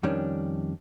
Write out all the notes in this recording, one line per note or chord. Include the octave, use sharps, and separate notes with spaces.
F2 D#3 G3 C#4 D4